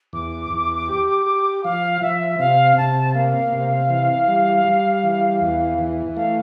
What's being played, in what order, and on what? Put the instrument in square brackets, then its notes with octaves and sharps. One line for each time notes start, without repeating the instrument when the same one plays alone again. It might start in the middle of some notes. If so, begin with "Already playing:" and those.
[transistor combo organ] E2 [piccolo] D6
[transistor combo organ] E2
G4
G4
[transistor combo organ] F3 [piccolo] F5
[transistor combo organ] F3 [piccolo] E5
[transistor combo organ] C3 [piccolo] F5
[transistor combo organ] C3 [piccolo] A5
[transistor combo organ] A#3 [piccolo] F5
[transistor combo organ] C3
E3
G3
G3
E3
E2
E3
[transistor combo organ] A3 [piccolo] F5